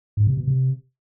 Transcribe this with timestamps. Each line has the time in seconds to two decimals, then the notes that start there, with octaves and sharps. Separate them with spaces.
0.17 G#2
0.27 C3
0.37 B2
0.47 C3